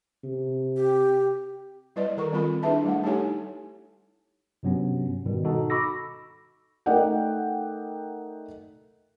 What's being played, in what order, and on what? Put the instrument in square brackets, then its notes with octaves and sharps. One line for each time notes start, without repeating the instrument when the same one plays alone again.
[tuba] C3
[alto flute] G4
[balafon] G3 E4 B4 D5 D#5
D#3 A4 A#4 A#5 C#6
G3 C4 F4 A4 A#4 B5
D4 E4 G#4 B4 E5 A5
G3 A3 F#5
D#4 E4 G4 A4 C#5 G#5
[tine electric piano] G2 C3 F#3 B3 C#4
G#2 B2 D#3 G3
D#4 F#4 A4
B5 C#6 D6 E6 A#6
[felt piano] A3 D#4 A#4 D5 F#5 G5